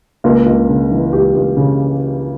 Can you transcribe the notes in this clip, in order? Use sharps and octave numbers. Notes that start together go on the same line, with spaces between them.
C#2 A#3
C#2
C#3
E3
C#2 G4
C#2
C#3